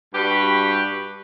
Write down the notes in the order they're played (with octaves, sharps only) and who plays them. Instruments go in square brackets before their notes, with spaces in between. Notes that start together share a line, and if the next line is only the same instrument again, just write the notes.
[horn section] G2 G3 F#4 G4 B4